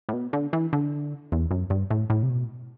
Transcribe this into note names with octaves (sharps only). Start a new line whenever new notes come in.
A2
B2
D3
E3
D3
E2
F#2
G2
A2
A2
C3
B2